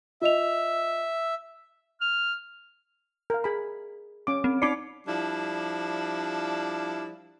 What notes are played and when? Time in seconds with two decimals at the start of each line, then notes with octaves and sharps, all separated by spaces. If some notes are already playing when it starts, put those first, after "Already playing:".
0.22 F4 D#5 E5 F7
2.01 F6
3.30 A#4 F5
3.44 G#4 B5
4.27 C#4 D6
4.44 C4
4.62 D#4 D5 B5 D6 C7 C#7
5.07 F3 G3 D4 E4 D5